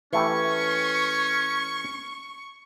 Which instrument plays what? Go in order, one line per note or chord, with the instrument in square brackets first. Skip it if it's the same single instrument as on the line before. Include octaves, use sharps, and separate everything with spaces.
[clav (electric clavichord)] E3 A3 G4 [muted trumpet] C#4 [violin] C#6